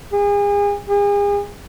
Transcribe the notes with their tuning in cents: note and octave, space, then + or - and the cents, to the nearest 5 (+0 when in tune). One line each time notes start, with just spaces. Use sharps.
G#4 -35
G#4 -40